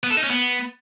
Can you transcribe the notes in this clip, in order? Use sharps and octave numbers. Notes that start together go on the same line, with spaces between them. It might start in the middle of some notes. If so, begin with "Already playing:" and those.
B3
A4
D#4
C#4
B3